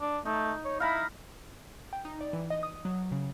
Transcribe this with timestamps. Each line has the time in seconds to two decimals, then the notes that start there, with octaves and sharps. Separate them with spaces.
0.01 D4
0.25 A3 D#4
0.65 C#5
0.80 E4 F5 A#5 B5
1.93 G5
2.05 D#4
2.21 D5
2.33 E3
2.50 D#5
2.63 D#6
2.85 F#3
3.12 C#3